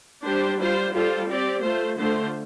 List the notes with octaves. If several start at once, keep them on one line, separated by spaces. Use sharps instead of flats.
G3 D4 G4 C5
G3 F4 C5
G3 F4 A4 C5
C4 G4 D5
A3 F4 C5
D3 A3 F4 C5